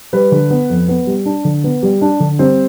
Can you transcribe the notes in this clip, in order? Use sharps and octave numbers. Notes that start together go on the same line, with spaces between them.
G3 B4
D3
B3
F2
B3
G3
D4
D3
B3
G3
D4
D3
G3 C4 C5